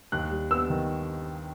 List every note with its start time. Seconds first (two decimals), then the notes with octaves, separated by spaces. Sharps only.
0.12 D#2 F#6
0.31 G3
0.51 B3 E6
0.70 D#3